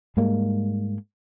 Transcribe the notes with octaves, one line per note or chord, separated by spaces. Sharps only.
G#2 G3 G#3 A#3